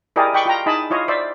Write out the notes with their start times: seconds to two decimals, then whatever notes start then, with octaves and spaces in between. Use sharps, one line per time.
0.16 E4 G4 G#4 A#4 D5 D#5
0.34 D#5 G5 B5 C#6 D6
0.46 F4 G5 A#5
0.66 D#4 E4 G#4 D#5 A5 B5
0.90 E4 F4 C#5 D#5
1.08 C5 D5 E5